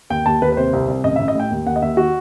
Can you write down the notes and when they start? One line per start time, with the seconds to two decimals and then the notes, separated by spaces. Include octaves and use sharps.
0.10 D#2 G5
0.26 D#2 A5
0.42 D#2 B4
0.52 B4
0.57 C3 C5
0.73 C2
0.88 C2
1.04 A1 D#5
1.16 A1 E5
1.28 D#5
1.35 A2 G5
1.51 D#2
1.66 D#2 F#5
1.76 D#5
1.82 D#2 E5
1.97 D#3 F#4